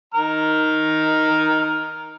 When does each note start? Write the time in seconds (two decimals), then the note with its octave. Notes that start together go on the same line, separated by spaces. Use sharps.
0.14 D#3 A#5 F6